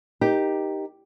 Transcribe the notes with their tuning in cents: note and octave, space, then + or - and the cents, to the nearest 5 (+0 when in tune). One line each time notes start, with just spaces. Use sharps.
D#4 +0 G4 +0 A#4 +20